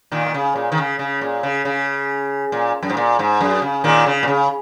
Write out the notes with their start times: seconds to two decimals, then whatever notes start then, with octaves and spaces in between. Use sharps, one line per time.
0.12 A#2 D#3
0.26 A#2
0.34 C#3
0.55 A#2
0.72 D#3
0.78 C#3
0.99 C#3
1.21 A#2
1.43 C#3
1.65 C#3
2.52 A#2
2.83 F#2
2.90 G#2
2.97 A#2
3.19 G#2
3.41 F#2
3.62 C#3
3.84 A#2 D#3
4.06 C#3
4.23 A#2
4.28 C#3